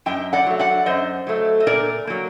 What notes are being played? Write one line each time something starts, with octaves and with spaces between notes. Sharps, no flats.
F#2 D#5 G5
D5 F#5
F#3 A3
D5 F#5
F#2 C5 D#5
F#3 A3
D#5
A#2 A#4 D5
F#3 A#3